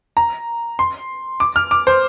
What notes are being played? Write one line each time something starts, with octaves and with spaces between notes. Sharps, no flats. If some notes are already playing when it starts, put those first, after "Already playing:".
A#5
C6
D6
F6
D6
C5